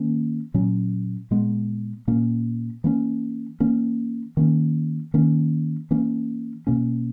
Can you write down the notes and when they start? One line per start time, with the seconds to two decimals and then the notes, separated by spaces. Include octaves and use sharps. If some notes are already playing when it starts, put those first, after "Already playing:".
Already playing: D#3 A#3 C#4
0.54 A#2 F#3 C#4
1.31 A#2 G#3 B3
2.07 A#2 A#3 C#4
2.84 E3 A#3 C#4
3.60 E3 A#3 C#4
4.37 D#3 A#3 C#4
5.14 D#3 A#3 C#4
5.91 E3 A#3 C#4
6.67 B2 A#3 C#4